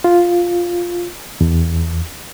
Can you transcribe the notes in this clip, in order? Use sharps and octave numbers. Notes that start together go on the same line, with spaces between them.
F4
E2